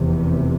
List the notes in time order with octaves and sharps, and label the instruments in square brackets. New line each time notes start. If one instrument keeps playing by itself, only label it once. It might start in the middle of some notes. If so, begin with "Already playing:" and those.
Already playing: [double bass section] F1 E2 C3